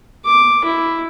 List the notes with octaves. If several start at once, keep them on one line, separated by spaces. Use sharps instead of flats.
D6
E4